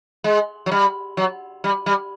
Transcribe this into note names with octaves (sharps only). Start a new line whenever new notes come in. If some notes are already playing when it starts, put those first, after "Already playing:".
G#3
F#3
G3
F#3
G3
G3